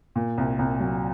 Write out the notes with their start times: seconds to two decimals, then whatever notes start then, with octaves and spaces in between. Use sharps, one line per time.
0.16 A#2
0.38 C2
0.59 C2
0.80 F#3